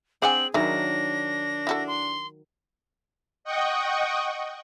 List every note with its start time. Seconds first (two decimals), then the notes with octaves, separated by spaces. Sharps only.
0.22 C4 D4 G#4 F#5 G#5 F#7
0.54 D#3 E3 F#3 D4 E4 A#4 A#6
1.67 E4 F#4 A4
1.87 C6
3.44 D#5 F#5 G5 C#6 D#6